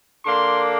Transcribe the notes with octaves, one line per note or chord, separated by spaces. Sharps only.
D3 A#3 D4 C6